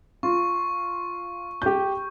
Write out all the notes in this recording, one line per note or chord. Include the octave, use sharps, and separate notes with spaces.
F4 C#6
G4 G6